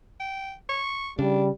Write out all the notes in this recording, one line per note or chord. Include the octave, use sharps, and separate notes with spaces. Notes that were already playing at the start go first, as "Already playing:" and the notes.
G5
C#6
C#3 G3 D4